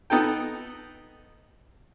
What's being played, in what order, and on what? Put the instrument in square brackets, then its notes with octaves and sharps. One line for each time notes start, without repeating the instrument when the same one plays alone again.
[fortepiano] B3 D#4 A4 G5